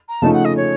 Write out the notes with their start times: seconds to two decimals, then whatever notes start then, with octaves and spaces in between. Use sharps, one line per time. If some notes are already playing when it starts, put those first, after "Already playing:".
0.08 A#5
0.22 C#3 F3 A3 D#4 A5
0.33 F#5
0.45 D#5
0.57 C#5